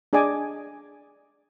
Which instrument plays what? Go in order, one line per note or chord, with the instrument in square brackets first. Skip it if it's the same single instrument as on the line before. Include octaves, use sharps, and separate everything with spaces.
[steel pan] D4 G#4 D5 D#5 G#5 D6